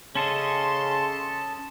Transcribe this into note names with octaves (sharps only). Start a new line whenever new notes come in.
C#3 C#4 A4 D#5 A5 C6